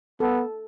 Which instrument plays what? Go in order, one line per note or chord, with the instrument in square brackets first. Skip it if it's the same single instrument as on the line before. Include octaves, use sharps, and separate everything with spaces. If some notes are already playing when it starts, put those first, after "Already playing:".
[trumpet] B3 [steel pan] A4